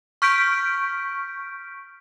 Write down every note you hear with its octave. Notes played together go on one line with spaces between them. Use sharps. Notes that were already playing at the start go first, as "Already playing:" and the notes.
C#6 F6 G6 B6 D7